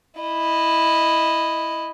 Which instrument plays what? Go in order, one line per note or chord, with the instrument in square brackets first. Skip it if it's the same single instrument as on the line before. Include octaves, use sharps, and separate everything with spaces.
[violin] E4 D#5